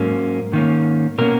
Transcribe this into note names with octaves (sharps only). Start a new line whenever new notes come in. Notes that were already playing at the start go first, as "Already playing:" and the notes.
Already playing: G#2 F#3 A#3 C#4 A#4
G#2 D#3 A#3 C#4
B2 A#3 C#4 A#4